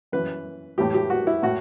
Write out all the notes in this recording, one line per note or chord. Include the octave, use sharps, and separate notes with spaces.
F#2 E3 B4
A2 E3 G4
G4
F#4
E4
A2 F#4